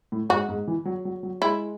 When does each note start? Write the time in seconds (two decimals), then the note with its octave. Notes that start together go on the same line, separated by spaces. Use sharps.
0.12 A2
0.30 G#2 F#4
0.49 G#2
0.67 E3
0.85 F#3
1.05 F#3
1.23 F#3
1.42 G#3 E4